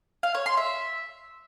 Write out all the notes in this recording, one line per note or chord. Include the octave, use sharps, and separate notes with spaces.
F5
C#5
C6
E5